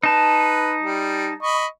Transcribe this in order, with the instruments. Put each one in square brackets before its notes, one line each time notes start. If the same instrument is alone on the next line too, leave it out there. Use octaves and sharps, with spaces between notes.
[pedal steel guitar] D#4 A5 [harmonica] B4
[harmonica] G3
D#5 B5 C#6